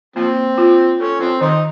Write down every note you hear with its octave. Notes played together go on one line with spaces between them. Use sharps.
F3 A#3 C4
F4
C#4 A4
F3 C4
D#3 C4 D#4